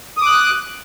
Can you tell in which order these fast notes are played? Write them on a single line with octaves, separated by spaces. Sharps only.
D#6 D6 F#6